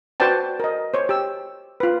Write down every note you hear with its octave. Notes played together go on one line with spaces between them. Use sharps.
F#4 B4 C5 D5 G5 A5
A#4 D#5
C5 C#5
G4 E6
F4 B4